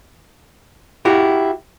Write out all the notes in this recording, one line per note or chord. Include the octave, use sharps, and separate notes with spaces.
E4 F#4 G4